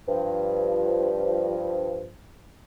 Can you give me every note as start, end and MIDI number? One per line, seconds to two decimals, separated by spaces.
0.08 2.08 43
0.08 2.08 53